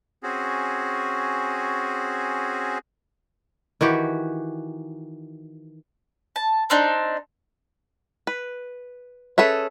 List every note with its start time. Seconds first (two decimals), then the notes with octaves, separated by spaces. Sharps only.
0.23 C4 C#4 F#4 G#4
3.81 D#3 E3 F#4 G4
6.36 A5
6.70 C4 D4 D#4
8.27 B4
9.38 C#4 G#4 A4 B4 E5